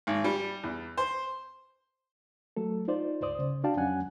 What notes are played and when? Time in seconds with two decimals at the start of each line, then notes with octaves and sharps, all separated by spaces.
0.07 G#1
0.24 G3
0.63 E2
0.97 C5
2.57 F#3 A3 A4
2.88 D#4 F4 C5 D5
3.21 C#2 G2 C5 D5 D#6
3.39 C#3
3.64 D4 F#4 D5 F5 G5 A5
3.77 F2 F#3 C#4 F#5 G#5 F#6